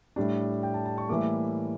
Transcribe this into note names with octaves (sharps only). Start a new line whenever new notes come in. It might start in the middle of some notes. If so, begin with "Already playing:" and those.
A2 G3 D4
G5
A5
A5
C#6
A2 E3 G3 A#3 D6